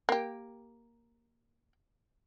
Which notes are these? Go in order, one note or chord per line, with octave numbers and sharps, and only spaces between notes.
A#3 G4